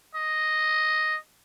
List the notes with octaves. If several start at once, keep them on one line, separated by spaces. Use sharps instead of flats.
D#5